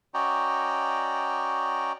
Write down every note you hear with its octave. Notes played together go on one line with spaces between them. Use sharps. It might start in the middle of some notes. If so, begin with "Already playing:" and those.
C#4 F#4 D5 D#5 G5 A#5